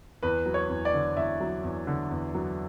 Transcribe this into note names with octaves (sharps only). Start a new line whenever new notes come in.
E2 B4
F#3
C#5
E2
D5
D3
E2 E5
F#3
E2
D3
E2
F#3